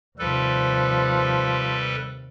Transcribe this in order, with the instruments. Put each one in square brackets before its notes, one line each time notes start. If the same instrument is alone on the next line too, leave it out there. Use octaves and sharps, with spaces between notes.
[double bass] D#2 C3 [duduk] F3 [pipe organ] G3 A4 B4